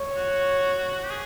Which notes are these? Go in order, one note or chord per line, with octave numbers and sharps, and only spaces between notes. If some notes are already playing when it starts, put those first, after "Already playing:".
Already playing: C#5
F#4
G4
G#4